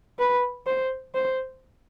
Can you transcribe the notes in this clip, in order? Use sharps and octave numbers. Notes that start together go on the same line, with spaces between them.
B4
C5
C5